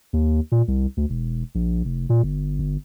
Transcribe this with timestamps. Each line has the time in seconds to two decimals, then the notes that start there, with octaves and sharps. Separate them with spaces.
0.13 D#2
0.52 A#2
0.68 C2
0.97 D2
1.10 E1
1.55 A#1
1.85 F1
2.09 A#2
2.23 G1
2.59 G1